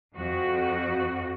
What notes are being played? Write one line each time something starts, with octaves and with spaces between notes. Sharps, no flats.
F2 F#4